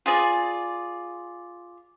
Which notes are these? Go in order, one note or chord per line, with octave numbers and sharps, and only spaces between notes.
F4 G#4 D5